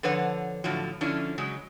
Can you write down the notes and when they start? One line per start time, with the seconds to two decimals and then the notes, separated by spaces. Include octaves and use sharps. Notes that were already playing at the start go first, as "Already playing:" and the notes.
0.03 D3 F3 B4 C#5 F#5
0.64 A2 D3 F3 F#3
1.01 D3 F3 C#4 D4 E4
1.38 C#3 F#3 G#3